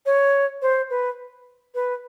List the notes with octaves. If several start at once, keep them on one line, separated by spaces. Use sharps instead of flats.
C#5
C5
B4
B4